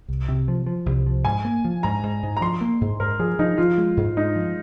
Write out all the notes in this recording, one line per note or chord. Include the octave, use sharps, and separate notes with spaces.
C2
C3
F3
F3
C2
F3
G#2 G#5
A#3
F3
G#2 A#5
G#2
G#2
A#5
F3 C6
A#3
G#2
G#2 A#4
F3 G#4
F3 D#4
F3 F4
G#3
G#2
G#3 D#4
F3